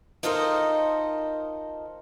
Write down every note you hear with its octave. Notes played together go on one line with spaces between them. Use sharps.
D#4 F4 A4 A#4 C5 D#5